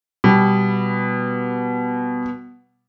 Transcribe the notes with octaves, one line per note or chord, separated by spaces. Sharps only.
B2 G3